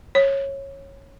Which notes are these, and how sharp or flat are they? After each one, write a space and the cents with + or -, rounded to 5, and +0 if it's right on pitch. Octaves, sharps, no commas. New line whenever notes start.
C#5 -15